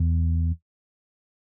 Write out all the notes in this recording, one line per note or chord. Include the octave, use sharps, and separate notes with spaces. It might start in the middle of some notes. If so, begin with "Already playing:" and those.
Already playing: E2